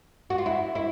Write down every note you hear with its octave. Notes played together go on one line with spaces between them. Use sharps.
F#4
F4
E4
E4